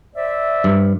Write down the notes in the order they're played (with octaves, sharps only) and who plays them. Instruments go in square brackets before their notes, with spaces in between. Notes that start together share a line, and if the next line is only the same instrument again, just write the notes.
[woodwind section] C5 D5 E5
[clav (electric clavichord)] G2